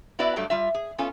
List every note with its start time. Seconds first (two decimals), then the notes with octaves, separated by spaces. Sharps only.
0.19 B3 E4 F#4 B4 D5 E5
0.36 G2 F#3 G3 A3
0.50 G3 F4 E5
0.74 G#4
0.98 B3 C#4 F4 A4 G#5